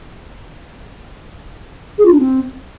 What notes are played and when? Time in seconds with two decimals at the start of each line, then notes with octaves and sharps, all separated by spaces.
1.98 G#4
2.05 F4
2.13 D4
2.20 C4